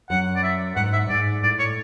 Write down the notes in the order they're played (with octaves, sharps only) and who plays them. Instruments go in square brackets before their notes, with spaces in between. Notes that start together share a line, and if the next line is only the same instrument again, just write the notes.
[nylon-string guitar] F#2 [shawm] F#5
[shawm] D5
E5
[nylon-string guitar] G#2 [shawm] F#5
[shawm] E5
[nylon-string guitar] G#2 [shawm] D5
[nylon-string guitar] A2 [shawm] D5
[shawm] C#5